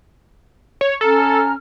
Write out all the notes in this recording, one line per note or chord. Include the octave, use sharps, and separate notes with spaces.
C#5
C#4 A4 A#5 F6